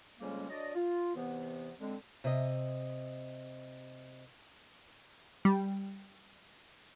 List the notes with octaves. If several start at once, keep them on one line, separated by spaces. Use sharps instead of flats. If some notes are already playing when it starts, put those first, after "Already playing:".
F2 C#3 G3 G#3 A#3 C#4
F#3 D4 D5 D#5
F4
E2 C3 E3 B3
D3 G#3 C4
C3 D#5
G3